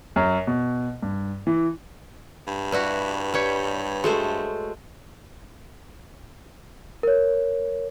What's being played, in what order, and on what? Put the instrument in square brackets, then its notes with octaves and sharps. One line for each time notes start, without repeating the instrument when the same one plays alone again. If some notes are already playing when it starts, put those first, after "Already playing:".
[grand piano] F#2
B2
G2
E3
[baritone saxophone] G2
[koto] G3 E4 F#4 [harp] B4
[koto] G3 G5 [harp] B4 C#5
[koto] G#3 A3 C5 [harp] F#4 A4
[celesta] A#4 C#5